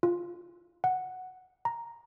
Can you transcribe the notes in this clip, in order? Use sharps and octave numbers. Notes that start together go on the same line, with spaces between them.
F4
F#5
A#5